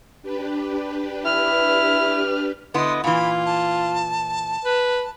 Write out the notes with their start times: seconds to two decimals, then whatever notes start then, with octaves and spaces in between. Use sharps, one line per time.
0.22 D4 G4 B4
1.25 E4 F6
2.74 D3 B3 E4 D#5 C6
3.04 A#2 E3 F4 B5
3.46 A5
4.65 B4